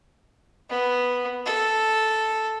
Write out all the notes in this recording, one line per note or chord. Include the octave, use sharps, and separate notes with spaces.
B3
A4